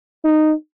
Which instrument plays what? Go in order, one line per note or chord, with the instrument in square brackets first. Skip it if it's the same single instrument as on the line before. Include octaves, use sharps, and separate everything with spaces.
[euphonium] D#4